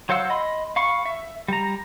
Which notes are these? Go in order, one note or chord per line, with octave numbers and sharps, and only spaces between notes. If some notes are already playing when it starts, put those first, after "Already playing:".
F#3 C5 F5 F#5 E6
D#5 B5 C6
F5 B5 C#6
E5
G3 A#5